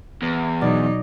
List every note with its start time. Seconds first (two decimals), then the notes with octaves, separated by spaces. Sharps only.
0.22 E2
0.61 B2 F#3 D#4 D5